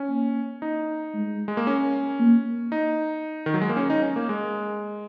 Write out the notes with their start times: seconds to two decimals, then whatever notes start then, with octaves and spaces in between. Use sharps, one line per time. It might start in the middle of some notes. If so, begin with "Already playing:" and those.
Already playing: C#4
0.10 A#3
0.62 D#4
1.14 G#3
1.48 G#3
1.57 A#3
1.67 C#4
2.19 A#3
2.72 D#4
3.46 D#3
3.54 F#3
3.62 G#3
3.69 A#3
3.77 C#4
3.90 D#4
4.02 C#4
4.16 A#3
4.29 G#3